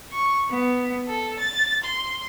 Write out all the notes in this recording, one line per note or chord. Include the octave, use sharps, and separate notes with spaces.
C#6
B3
A4
A6
C6